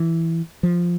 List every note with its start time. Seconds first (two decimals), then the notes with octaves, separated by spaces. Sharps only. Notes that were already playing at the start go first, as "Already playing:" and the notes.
Already playing: E3
0.63 F3